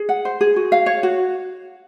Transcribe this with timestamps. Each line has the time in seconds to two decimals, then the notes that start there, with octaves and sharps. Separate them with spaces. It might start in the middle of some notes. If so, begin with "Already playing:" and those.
Already playing: G#4
0.09 F#5
0.25 C5
0.41 G#4
0.56 F#4
0.72 F5
0.86 C#5
1.03 F#4